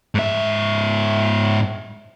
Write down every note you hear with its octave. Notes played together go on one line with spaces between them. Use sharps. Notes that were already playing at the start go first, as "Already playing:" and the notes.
G#2 E5